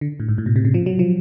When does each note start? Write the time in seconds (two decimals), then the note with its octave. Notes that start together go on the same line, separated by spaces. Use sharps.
0.01 D3
0.20 A2
0.28 G#2
0.38 A2
0.46 B2
0.56 C3
0.65 C#3
0.74 F3
0.86 F#3
0.99 F3